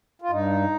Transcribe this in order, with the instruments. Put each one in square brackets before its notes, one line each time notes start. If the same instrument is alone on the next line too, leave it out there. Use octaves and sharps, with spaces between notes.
[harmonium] F4
G2 D#4